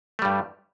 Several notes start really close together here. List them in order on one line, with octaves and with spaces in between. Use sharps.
A3 G3 G2